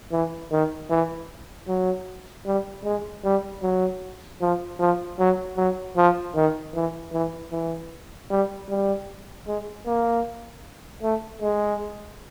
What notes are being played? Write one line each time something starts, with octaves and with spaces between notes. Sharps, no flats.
E3
D#3
E3
F#3
G3
G#3
G3
F#3
F3
F3
F#3
F#3
F3
D#3
E3
E3
E3
G3
G3
G#3
A#3
A3
G#3